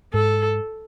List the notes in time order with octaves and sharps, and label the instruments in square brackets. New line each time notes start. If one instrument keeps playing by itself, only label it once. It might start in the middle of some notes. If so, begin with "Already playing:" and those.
[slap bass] G#2 [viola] A4